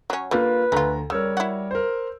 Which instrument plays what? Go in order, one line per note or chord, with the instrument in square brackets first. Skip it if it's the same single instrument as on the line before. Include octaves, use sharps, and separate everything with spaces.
[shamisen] F#3 C#4
[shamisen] D3 G3 [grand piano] A#3 F4 A#4 [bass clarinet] B4
[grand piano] D2 A#5 [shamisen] A3 F4
[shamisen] C#3 [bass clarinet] G3 [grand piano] A#4 C#5 E6
[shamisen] E4 F#4
[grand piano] A#4 C5